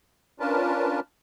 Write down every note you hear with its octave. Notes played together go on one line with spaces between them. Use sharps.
C#4 D4 F4 A#4 B4 A5